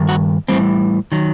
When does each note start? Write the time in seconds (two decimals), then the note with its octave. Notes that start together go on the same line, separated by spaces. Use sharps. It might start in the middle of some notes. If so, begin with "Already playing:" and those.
Already playing: G2 D#3
0.09 F#4
0.48 A2 E3 G3 C4
1.12 D#3 F#3